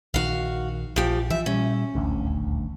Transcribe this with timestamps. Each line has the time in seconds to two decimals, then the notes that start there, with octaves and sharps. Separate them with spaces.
0.14 A#1 D#3 F#4 F5
0.96 A#1 F3 G4
1.30 E3 F3 E5
1.46 A#2 G3 C#4
1.95 D#1 A1 D2